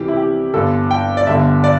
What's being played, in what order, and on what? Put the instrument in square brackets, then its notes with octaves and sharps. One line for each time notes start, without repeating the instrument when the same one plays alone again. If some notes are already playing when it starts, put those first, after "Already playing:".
Already playing: [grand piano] C2 C3 E3 G4
E4
G4
G1 G2 D3 A4
G5
D5
G1 G2 D3 E5
D5